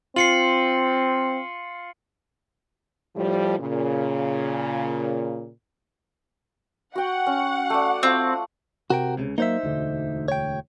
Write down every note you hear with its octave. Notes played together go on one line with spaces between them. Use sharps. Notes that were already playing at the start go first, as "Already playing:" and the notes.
C4 F4 C7 C#7 F#7
A2 F3 G3
A#2 C#3
F#4 F#5 G5
C#4
A3 D5
A3 C4 F4 C#5
C3 F#4 A#4 G5
C#2 A#2 C#3
F#3 A#3 D#4 C5 E5
E1 D2 D3
C#5 G5